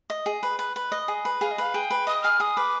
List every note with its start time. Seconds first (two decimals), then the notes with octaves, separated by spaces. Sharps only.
0.10 D#5
0.26 G#4
0.43 B4
0.59 B4
0.76 B4
0.92 D#5
1.08 G#4
1.25 B4
1.41 G#4 F5
1.51 D#5
1.58 B4 F5
1.74 G#4 G5
1.90 B4
2.07 D#5 D#6
2.23 G#4 F6
2.40 G#4 D#6
2.57 B4 D6